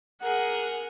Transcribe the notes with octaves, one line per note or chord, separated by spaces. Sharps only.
G#4 A#4 F#5